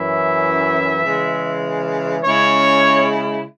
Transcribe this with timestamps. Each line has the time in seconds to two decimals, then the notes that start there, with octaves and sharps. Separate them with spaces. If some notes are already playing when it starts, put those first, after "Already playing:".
Already playing: F#2 E3 C#4 E4 E5
1.04 C#3 E3 G#3
2.23 C#3 G#3 C#4 E4 C#5